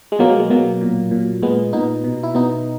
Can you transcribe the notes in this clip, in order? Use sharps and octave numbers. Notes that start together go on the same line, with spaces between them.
G#3
B2 F#3 A#3
G#3
G#3
B2 F#3 A#3
A#2
A#2
A#2 G#3 B3
A#2 B3 D#4
B2
E4
B2 B3 D#4